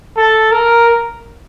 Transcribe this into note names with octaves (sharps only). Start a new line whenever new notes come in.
A4
A#4